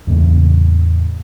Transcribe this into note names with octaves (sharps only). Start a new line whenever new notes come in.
E2 A2 C#3 A#3